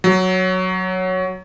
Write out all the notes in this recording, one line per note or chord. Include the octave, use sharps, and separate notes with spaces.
F#3